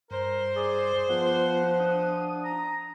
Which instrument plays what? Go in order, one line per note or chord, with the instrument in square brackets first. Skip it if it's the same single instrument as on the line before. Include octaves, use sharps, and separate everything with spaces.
[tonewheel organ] G2 [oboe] A#4 [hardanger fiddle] C5
[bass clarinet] G#4 [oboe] D5
[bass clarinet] F3 [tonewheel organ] B3 F4 [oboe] F#5
[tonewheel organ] D4 D#6
[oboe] A#5